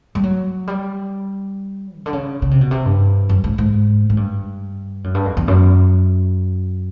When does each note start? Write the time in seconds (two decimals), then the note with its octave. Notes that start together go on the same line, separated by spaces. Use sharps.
0.15 G3
0.23 F#3
0.68 G3
1.98 C#3
2.06 D3
2.13 C#3
2.42 C#3
2.51 C3
2.61 B2
2.71 C3
2.86 G2
3.29 F#2
3.44 G#2
3.58 G#2
4.10 G#2
4.17 G2
5.04 F#2
5.15 G2
5.26 F2
5.37 E2
5.48 F#2